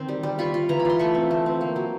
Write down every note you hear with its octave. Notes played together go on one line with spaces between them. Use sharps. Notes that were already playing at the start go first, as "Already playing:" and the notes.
Already playing: D#3 C4 C6
G3
G3
F4 B5 C#6
F4
E3 A#5
B5
F4 C6
A3 B5 C#6
C4
A3
C4
A#3
F#3